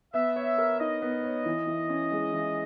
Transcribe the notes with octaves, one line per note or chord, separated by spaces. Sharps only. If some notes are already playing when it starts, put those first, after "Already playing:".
B3 E5
C#5
A#4
D#4 D#5
B3
C#5
E3
E3
C#4
G#3
E3